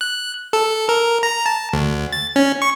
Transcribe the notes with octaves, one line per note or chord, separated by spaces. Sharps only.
F#6
A4
A#4
A#5
A5
D2
A6
C#4
C#6